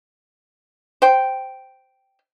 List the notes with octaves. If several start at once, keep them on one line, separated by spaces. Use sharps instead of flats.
C5 G5